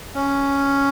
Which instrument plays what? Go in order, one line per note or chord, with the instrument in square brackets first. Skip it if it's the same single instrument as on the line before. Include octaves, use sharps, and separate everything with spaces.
[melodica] C#4